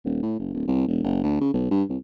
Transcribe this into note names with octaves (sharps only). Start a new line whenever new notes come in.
D#1
A2
F#1
D1
C2
E1
F#1
D2
C#3
B1
G2
C2